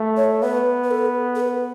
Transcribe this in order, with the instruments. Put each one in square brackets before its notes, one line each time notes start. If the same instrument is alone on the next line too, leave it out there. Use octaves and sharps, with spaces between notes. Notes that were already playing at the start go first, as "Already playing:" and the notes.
Already playing: [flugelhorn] A3
[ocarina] C#5
[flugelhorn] B3 [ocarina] B4
[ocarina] B4
A4
A4
B4